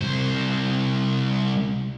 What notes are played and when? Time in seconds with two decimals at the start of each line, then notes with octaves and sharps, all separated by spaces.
0.01 C2 C5